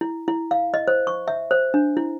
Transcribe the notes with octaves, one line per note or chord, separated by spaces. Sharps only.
E4
E4
F5
D#5
C5
C#6
E5
C5
D4
E4